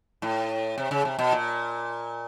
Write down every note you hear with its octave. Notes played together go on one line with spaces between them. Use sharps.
A2
C3
C#3
C3
B2
A#2